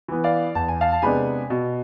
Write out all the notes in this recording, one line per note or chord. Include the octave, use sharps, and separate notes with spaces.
E3 B3
D5 F5
E2 A5
G#5
F5 A5
A5
C3 G#3 B3 D4 G#5 B5
B2